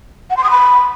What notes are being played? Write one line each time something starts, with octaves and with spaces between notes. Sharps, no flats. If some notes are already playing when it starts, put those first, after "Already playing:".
F#5
C6
D#6
B5